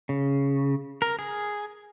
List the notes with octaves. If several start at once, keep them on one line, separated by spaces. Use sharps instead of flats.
C#3
A#4
G#4